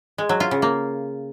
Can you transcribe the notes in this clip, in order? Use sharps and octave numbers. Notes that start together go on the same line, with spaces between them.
G#3
F#3
F4
C#3
A#3